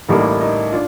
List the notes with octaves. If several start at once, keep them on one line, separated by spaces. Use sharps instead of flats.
A1 A2 G3 A#3 D#4
D#4
D4 F4